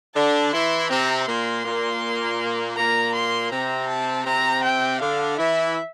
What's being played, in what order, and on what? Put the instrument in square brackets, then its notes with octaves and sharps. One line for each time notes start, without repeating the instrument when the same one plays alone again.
[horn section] D3 D4 [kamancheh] A5
[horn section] E3 E4 [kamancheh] C6
[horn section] C3 C4 [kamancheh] A#5
[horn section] A#2 A#3 [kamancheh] C6
[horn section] A#2 A#3
[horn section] A#2 A#3 [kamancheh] A#5
[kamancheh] C6
[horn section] C3 C4 [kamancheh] A#5
[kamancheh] A5
[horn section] C3 C4 [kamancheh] A#5
[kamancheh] G5
[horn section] D3 D4 [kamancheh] F5
[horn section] E3 E4 [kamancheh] E5